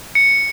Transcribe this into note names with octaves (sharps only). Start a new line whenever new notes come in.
C#7